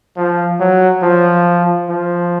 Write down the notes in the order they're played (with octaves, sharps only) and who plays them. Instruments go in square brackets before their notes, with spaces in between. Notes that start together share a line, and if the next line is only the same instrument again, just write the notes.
[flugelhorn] F3
F#3
F3
F3